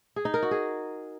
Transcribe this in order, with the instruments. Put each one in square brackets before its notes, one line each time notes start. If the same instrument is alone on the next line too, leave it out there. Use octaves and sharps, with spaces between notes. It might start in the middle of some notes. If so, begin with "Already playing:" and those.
[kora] G#4
D#4
A#4
F#4
G#4